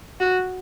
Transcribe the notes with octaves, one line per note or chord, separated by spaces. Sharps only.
F#4